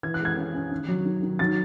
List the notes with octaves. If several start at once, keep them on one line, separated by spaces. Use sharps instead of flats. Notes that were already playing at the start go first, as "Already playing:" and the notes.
E3 G#6
F#6
G#3
G#6
C#4
C#4
D#3
F#3
D#3
D#3
F#3 A6